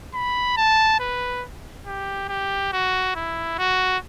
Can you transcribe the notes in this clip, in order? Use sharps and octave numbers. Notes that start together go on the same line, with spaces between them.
B5
A5
B4
G4
G4
F#4
E4
F#4